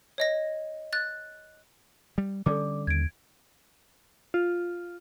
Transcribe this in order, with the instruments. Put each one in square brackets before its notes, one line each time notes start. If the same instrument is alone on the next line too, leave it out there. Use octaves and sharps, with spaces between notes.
[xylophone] C#5 D#5 A#6
F#6 A6
[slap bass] G3
[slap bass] D3 G3 C#4 [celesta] A4 D5 D6
[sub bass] D#2 [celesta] G#6 D7
[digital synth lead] F4